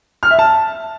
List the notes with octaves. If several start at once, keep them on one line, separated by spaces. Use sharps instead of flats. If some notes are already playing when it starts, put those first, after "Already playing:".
F6
E5
A5